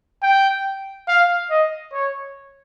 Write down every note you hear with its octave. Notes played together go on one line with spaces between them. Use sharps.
G5
F5
D#5
C#5